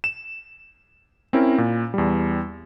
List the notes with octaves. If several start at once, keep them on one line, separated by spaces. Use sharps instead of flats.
E7
C4 C#4 E4 A#4
A#2
E2 G3